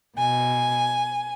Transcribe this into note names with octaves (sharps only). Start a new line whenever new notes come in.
B2 G#5